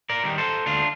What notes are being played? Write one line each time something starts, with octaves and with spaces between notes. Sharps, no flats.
A#4 D5
D#3 G3
A4 C5
D2 D4 F4